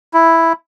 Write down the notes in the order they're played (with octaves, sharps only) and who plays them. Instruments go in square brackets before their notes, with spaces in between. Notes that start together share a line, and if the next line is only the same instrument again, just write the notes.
[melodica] E4